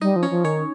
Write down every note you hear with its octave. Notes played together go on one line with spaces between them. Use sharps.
G3 D#4 D#5
F3
C#4 C#5
F3
D#3 C#4 C#5